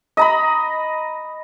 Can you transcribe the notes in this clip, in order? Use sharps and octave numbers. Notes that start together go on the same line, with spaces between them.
D#5 A#5 B5